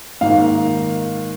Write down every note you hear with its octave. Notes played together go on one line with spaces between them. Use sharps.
G#2 D#3 A#3 F5